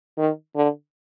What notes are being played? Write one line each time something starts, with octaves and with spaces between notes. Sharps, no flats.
D#3
D3